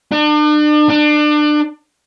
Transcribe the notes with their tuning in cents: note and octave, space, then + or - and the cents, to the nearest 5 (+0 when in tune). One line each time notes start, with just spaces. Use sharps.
D4 +40
D4 +30